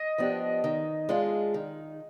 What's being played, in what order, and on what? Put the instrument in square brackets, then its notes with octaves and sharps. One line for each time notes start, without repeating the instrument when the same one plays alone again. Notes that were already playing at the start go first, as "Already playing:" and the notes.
Already playing: [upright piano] D#5
[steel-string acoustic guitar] F3 B3 D4 G4
D#3
G#3 D4 F4
D#3